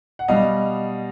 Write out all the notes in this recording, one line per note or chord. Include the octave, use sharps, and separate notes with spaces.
F#5
B2 G3 D#5 F5